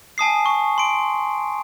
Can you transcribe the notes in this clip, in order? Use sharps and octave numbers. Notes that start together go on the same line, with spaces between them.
G#5 A5 D#6 C7
C#6
C6 D7